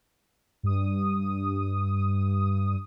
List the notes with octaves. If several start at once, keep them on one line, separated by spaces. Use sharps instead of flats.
G2 D#6